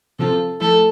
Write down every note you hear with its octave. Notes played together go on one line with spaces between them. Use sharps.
C3 F3 C4 F4 A4
F3 A3 E4 A4